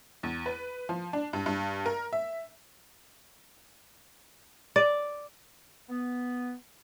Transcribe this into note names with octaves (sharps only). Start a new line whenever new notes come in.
E2
B4
F3
D4
G2
G2
A#4
E5
D5
B3